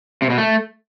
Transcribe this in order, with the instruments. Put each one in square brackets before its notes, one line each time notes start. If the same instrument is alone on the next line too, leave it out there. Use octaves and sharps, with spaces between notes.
[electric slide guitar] C3
B2
A3